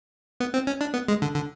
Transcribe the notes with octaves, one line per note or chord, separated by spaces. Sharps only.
B3
C4
C#4
D4
B3
G#3
D3
D3